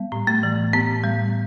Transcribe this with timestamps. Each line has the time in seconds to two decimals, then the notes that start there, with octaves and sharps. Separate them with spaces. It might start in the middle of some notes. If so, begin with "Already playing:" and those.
Already playing: G3 B3
0.12 A2
0.27 A3
0.43 E3
0.73 A2 B3
1.04 G3